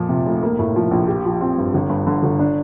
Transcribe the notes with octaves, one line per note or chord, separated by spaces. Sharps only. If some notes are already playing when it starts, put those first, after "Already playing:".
Already playing: F2 A#2 F3
C3
F1
A#3
A2
F3
A#1
G4
F3
C4
G2
G1
G2
D3
G1
D4